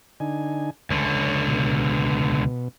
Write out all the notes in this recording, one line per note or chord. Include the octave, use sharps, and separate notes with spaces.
D3 D#4 G#5
C#2 D3 C#5
B2